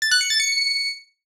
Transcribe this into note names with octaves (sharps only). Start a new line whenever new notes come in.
A6
F#6
C#7
A6
C#7